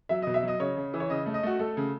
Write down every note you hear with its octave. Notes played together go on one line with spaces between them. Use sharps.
F#3 E5
B2 D#5
E5
F#3 D#5
C#3 C#5
C#3
E3
C#5
C#3 D#5
A3
D#5
A3 F#4
A3 A4
C#3